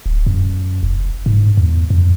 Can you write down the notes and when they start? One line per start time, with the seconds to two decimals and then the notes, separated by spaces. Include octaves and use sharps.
0.06 D1
0.27 F#2
0.83 F1
1.26 G#2
1.57 E2
1.90 F2